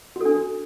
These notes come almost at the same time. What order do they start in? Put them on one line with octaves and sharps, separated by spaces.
F#4 A4 D4